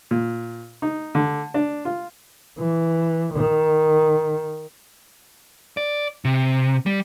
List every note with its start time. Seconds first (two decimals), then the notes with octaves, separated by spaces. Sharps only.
0.11 A#2
0.82 D#4
1.15 D3
1.54 D4
1.85 F4
2.59 E3
3.34 D#3
5.77 D5
6.25 C3
6.86 G3